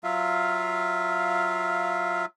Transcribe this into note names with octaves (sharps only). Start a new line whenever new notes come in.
F#3 F4 E5 F5